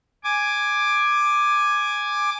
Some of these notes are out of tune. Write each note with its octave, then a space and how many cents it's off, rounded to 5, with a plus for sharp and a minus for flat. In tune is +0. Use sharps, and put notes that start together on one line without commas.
G#5 +0 D6 +10